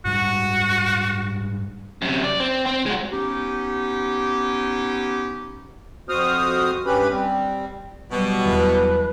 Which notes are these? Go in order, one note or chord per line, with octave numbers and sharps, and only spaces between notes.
G#2 G3 G#3 F#4
F#2 C3
D5
C4
C4
G#3 F#4
B3 C#4 D#4 G4
F2 F#4 C5 D#6 F6
G2 C#4 G4 B4 B5
G3 C4
B2 F#3 G3
E2 B4